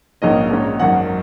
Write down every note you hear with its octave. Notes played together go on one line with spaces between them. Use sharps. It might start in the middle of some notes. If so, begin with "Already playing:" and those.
A#1 G#2 D#3 A#3 C#4 D#5
A#1 G#2 G#3 C#4
G#1 F#2 D#3 F#5